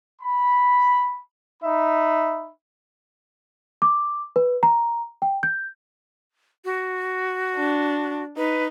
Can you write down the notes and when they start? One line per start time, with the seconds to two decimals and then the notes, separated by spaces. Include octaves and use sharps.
0.21 B5
1.62 D#4 E5 B5
3.82 D6
4.36 B4
4.63 A#5
5.22 G5
5.43 G6
6.65 F#4
7.56 D4
8.37 D#4 B4